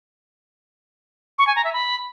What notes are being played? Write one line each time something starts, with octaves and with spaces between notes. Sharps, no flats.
C#6
G#5
A#5
E5
B5